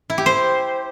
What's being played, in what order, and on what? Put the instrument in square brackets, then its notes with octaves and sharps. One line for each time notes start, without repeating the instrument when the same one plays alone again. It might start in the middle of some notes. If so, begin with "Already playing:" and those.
[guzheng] E4
G4
C5